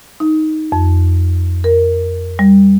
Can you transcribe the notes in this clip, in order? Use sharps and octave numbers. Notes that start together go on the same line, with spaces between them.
D#4
F2
A#4
G3